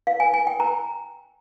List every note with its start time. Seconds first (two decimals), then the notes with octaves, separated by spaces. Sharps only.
0.07 F5
0.20 G#5
0.34 G#5
0.47 G5
0.60 A#5